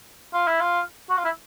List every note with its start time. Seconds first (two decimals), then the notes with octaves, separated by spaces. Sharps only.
0.33 F4
0.47 E4
0.61 F4
1.10 F#4
1.17 F4
1.25 E4